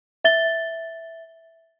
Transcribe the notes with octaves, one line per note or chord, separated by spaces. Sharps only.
E5 A6 G7